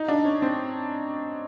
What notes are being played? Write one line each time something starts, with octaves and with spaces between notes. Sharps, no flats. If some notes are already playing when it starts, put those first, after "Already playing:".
Already playing: D#4
D4
C#4
C4